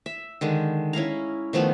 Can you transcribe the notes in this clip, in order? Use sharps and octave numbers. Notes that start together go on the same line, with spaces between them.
E5
D3 D#3 G#3
C#4 E4 F5 A#5
D#3 F3 A3 B3